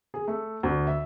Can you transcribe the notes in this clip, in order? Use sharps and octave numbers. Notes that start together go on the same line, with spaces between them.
G#4
A3
D2
E5